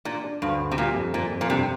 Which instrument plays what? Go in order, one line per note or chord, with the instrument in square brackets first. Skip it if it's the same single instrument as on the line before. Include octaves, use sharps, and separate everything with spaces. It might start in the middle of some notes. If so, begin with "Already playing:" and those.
[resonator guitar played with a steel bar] A#2 [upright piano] D4
[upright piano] D4
[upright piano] D2 [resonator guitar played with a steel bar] G2
[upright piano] D2
[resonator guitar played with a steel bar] C3
[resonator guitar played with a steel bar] A#2 [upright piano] G3
[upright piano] F2
[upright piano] F2 [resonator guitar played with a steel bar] A#2
[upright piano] F2
[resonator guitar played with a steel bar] A#2
[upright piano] G2 [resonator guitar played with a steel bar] C3